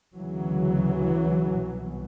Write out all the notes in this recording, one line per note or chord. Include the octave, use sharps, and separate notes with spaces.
D2 C#3 E3 F#3
C2 B2